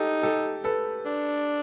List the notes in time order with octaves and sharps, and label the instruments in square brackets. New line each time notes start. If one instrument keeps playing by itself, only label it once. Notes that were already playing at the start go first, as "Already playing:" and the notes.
Already playing: [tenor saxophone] D#4 [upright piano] G4 A4
[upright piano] G4 A4
A4 B4
[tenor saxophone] D4